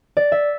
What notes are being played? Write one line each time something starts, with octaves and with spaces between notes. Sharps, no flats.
D5
E5